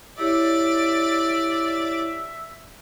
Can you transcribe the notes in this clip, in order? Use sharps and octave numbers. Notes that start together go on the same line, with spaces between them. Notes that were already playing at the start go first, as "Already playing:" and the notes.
E4 G4 C#5 D5 E5 D6